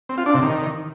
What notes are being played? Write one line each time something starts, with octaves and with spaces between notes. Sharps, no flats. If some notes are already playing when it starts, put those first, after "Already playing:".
C4
F4
D4
C3
D#3